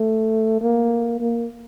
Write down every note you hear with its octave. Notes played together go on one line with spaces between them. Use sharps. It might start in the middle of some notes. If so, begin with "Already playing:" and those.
Already playing: A3
A#3
A#3